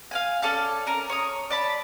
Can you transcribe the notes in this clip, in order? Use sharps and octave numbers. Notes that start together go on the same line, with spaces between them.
F5 F#5 G#5
C#4 A4 D5 A5
C#4 A#4
C#5 A#5 D#6
D5 A5 B5